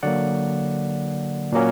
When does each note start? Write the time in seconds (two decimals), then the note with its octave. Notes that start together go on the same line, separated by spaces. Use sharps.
0.03 D3 F#3 A#3 D5 F#5
1.52 A#2 F#3 A#3 C#4